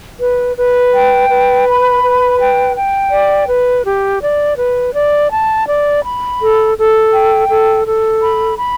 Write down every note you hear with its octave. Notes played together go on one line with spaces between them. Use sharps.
B4
B4
G5
B4
B5
B4
G5
G5
D5
B4
G4
D5
B4
D5
A5
D5
B5
A4
A4
G5
A4
A4
B5
B5